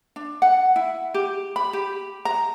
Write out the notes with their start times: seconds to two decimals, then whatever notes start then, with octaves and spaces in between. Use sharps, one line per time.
0.16 D4
0.42 F#5
0.76 E4
1.14 G4
1.56 B5
1.73 G4
2.25 A#5